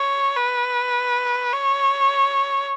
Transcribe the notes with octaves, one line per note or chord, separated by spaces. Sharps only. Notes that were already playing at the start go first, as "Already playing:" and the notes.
Already playing: C#5
B4
C#5